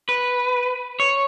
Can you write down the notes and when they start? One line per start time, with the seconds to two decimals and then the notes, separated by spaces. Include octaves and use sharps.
0.09 B4
1.00 C#5